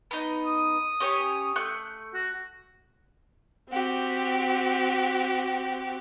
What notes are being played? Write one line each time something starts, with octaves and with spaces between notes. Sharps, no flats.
B3 D#4
D#6
C#4 G4 C#5
A3 F#6 G6
F#4
C4 F#4 G4